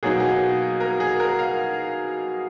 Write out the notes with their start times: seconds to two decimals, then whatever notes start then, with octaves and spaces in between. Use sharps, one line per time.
0.03 B2 F#3 A#3 D#4 G#4
0.20 G#4
0.80 A#4
1.00 G#4
1.20 A#4
1.39 F5